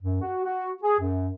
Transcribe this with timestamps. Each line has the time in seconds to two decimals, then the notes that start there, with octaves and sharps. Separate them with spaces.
0.02 F#2
0.22 F#4
0.45 F#4
0.83 G#4
0.99 F#2